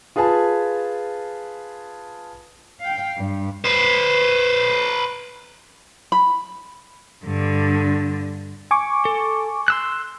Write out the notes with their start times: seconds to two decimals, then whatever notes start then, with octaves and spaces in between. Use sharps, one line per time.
0.16 F4 G#4 B4 G#5 A5
2.80 F5 G5
3.17 G2
3.65 B4 C5
6.12 B5
7.24 G2 D3
8.71 G#5 C#6 D6
9.05 A4
9.68 C6 E6 F#6